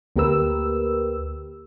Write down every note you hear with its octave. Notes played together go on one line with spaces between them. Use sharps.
D2 A#3 G4 A#4 B4 E6